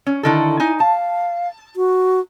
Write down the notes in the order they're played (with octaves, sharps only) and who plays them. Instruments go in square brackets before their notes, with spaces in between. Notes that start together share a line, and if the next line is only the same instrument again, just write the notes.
[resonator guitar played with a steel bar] C#4
[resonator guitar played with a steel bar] D3 D#3 A4 [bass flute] E4
[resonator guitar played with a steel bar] D#4 G#5
[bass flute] F5 [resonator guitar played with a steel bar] A5
[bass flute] F#4